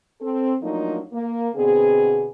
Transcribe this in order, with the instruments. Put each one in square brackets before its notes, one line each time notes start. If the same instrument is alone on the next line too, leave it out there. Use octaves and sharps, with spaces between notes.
[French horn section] C4 A4
F3 F#3 A3 A#3 D4 D#4
A#3
B2 D3 B3 C4 G#4